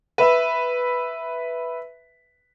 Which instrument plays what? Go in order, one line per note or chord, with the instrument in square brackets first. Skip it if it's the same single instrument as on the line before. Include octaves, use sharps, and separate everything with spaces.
[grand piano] B4 E5